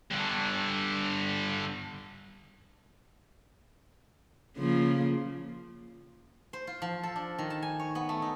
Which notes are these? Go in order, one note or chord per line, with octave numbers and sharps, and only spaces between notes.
G2 D3
C#3 F3 A#3
C5
F4
F3
A4
D4
D#3
A5
G#5
C#5
B3
A3
D#4